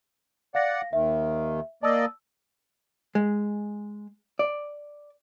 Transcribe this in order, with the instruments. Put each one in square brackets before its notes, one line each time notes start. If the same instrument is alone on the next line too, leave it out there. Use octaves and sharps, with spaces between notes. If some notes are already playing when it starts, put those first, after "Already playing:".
[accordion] D5 F#5 [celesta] F5 A#6
[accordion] D#2 D#3 [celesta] E5
[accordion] A#3 D5 D#5 [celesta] A5 E6
[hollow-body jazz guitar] G#3
D5